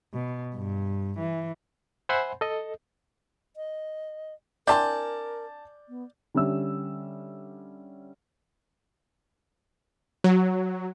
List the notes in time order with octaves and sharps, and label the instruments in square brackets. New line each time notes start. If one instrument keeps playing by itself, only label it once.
[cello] B2
G2
E3
[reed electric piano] C5 E5 F#5 G#5 B5 C6
A4 D#5
[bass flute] D#5
[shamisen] C4 D4 E4 [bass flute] A#4 [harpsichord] D5 [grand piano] G#5 A5 G6
[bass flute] B3
[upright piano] D3 G3 C#4 E5 E6
[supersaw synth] F#3